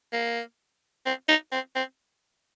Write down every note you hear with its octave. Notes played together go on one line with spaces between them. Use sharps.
A#3
C4
D#4
C4
C4